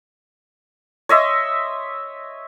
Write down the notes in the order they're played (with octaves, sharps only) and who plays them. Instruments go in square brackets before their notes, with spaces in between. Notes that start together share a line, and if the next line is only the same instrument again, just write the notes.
[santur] C#5 D#5 E5 C6